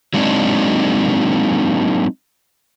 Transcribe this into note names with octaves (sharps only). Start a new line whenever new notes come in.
F#3 G#3 A#3 C4 D4 D#4